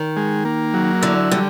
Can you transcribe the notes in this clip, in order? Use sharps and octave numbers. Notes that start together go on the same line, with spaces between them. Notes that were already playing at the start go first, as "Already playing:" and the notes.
Already playing: D#3
G#3
A#3
F#3
D3 E4
D3 G3